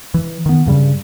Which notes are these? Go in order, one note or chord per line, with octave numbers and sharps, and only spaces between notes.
E3
D#3 B3
G2 C#3 G3